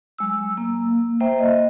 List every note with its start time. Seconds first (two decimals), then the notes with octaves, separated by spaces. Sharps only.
0.19 F#3 G#3 E6
0.57 A#3
1.20 A#3 C5 E5 G5
1.39 D#5